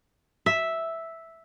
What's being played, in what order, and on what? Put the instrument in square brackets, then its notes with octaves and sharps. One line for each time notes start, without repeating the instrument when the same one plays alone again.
[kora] E5